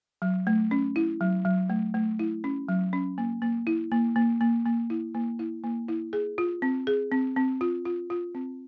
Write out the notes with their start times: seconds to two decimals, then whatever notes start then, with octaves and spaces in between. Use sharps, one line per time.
0.22 F#3
0.47 A3
0.71 C#4
0.96 E4
1.21 F#3
1.45 F#3
1.70 A3
1.94 A3
2.19 E4
2.44 C#4
2.68 F#3
2.93 C#4
3.18 A#3
3.42 A#3
3.67 E4
3.91 A#3
4.16 A#3
4.41 A#3
4.66 A#3
4.90 E4
5.15 A#3
5.39 E4
5.64 A#3
5.89 E4
6.13 G#4
6.38 F4
6.62 C4
6.87 G#4
7.12 C4
7.36 C4
7.61 F4
7.85 F4
8.10 F4
8.35 C4